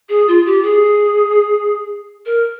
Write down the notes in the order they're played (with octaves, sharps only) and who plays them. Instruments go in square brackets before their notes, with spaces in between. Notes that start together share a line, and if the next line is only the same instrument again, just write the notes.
[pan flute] G#4
F4
G4
G#4
A#4